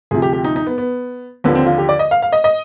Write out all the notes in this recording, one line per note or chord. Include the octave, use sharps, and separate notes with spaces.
D2 C3 F3 G#4
G4
G4
D#4
D#4
B3
B3
D#2 D3 F3 B3
C4
F4
G4
D5
D#5
F5
F5
D#5
D#5